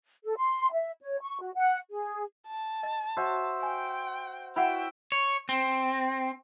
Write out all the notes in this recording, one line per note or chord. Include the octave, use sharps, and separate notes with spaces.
A4
C6
E5
C#5
C#6
F#4
F#5
G#4
A5
D#5
F#4 C5 E5
G5 G#5
E4 F#4 E5 F#5 G5 B5
C#5
C4